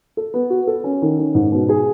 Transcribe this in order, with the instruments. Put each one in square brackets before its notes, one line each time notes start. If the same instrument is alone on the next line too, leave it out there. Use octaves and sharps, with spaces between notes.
[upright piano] A4
B3
F#4
A4
C#4
D#3
C#4
G#2
B2
G#4